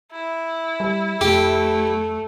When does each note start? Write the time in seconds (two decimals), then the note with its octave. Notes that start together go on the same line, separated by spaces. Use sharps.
0.12 E4
0.80 G3
1.21 F2 A3 G4